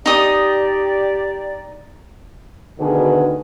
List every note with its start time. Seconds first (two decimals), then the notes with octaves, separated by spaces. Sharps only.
0.06 D#4 G4 D5 D#6
2.80 D2 B2 D3 D#3 G#4 B4